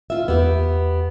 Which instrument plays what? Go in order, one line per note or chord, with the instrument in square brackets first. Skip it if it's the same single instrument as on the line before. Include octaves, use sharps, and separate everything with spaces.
[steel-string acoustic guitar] F4 E5
[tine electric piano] E2 [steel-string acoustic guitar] B3 G4